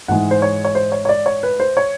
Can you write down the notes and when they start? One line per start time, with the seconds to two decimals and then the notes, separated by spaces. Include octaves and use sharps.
0.08 G#2 E3 G#3 F#5
0.31 C5
0.42 C#5
0.65 C#5
0.75 C5
0.92 C#5
1.05 C#5
1.09 D5
1.26 C#5
1.43 B4
1.60 C5
1.77 C#5